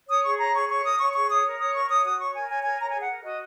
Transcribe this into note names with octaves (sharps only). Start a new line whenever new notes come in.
C#5 D#6
G#4 C#6
C#5 A#5
G#4 C#6
C#5 C#6
A#4 D#6
C#5 C#6
G#4 C#6
C#5 D#6
A#4
C#5 D#6
A#4 C#6
C#5 D#6
F#4 D#6
C#5 C#6
A#4 G#5
C#5 G#5
A#4 G#5
C#5 A#5
G#5
G#4
F#5
A#4
F#4 D#5